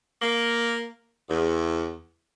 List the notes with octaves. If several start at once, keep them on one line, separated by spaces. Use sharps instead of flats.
A#3
E2